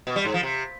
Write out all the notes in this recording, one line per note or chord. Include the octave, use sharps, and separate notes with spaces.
B2
G3
G#2
F3
C3